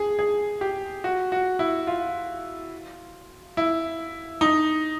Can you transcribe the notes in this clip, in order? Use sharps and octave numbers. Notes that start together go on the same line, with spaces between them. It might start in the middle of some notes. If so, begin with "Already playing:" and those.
Already playing: G#4
G#4
G4
F#4
F#4
E4
F4
E4
D#4